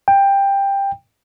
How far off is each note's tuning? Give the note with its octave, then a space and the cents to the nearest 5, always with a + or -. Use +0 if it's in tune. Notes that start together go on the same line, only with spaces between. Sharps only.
G5 +15